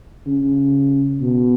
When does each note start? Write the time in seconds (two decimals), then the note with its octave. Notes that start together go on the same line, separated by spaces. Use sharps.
0.27 C#3
1.21 B2